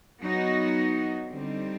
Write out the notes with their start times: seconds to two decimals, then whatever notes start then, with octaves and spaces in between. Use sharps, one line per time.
0.21 F#3 B3 D#4 F#4
1.28 D3 G3 C4 D#4